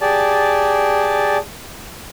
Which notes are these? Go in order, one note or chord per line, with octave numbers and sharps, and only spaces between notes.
G4 G#4 D5 A5